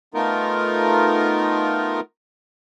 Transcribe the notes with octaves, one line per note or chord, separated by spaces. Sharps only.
A3 B3 D#4 F4 A#4